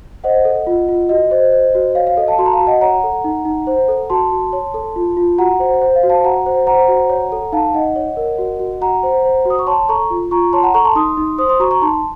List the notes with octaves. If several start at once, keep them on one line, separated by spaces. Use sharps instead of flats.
C5 D#5 F#5
A4
F4
F4
F#4 D#5
C5
C5
F#4
C#5 F5
F5
A4 D#5
F5 A5
F#4 A5 C6
A#5
F5 A5
F#4
D#5 F#5
C#5 F#5 A#5
A4
D#4
D#4
C5
A4
F#4 A5 C6
F#4
C#5
A4
F4
F4
F#4 F#5 A#5
C5
C5
F5
F#4
F5 A5
F#4 F#5 A#5
C5
C5 F#5 A#5
F#4
C#5
A4
D#4 F5 A5
D#4 D#5 F#5
C#5
A#4
F#4
F#4
F#4 F#5 A#5
C5
C5
F#4
D#6
C#6
C#5 A5 C6
A4 A#5 C#6
F4
F4 A#5 C#6
C#5 A5 C6
F#5 A#5
A4 A#5 C#6
A5 C6
D#4 C6 D#6
D#4
C5 C6 D#6
C6 D#6
F#4 A#5 C#6
A#5 C#6
D#4 A5 C6